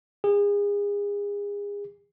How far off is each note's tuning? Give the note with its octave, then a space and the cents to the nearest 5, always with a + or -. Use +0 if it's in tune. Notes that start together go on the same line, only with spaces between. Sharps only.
G#4 -35